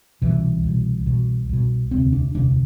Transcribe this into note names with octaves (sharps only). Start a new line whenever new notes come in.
C2 B2 E3
C2 B2
C2 B2
C2 B2
E1 D2 C3 C4
D4
E1 D2 C3 D4